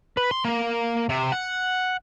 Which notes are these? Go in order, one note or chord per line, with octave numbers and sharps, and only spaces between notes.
B4
C6
A#3
C3
F#5